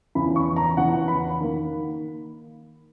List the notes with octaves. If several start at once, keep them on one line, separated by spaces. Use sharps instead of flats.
E2 C#3 E3 B5
C#6
A#5
E2 C#3 E3 F#5
B5
D#3 A#3